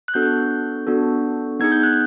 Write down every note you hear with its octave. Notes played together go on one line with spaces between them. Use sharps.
F#6
B3 D4 F#4 A4 G6
B3 D4 F#4 A4
B3 D#4 G#4 G#6
G6
F#6